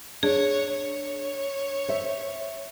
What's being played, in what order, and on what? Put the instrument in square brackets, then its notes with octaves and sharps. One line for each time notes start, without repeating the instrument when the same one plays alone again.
[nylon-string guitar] D4 [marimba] G#4 [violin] C#5
[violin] C#5
[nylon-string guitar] C5 E5